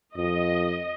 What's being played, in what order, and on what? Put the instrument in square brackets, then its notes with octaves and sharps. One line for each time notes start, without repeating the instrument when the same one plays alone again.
[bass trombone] F2 [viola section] D#5